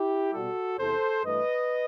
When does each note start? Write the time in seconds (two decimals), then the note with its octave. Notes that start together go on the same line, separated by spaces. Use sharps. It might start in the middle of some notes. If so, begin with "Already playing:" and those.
Already playing: E4 G4
0.32 B2 G3 F#4 A4
0.78 E2 C3 E3 A4 C5
1.24 G2 E3 A3 B4 D#5